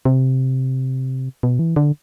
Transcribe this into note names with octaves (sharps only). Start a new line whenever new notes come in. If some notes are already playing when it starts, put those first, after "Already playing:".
C3
B2
E3
D3